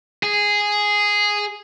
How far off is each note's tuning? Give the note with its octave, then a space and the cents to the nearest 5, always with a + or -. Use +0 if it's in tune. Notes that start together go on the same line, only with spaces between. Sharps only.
G#4 -5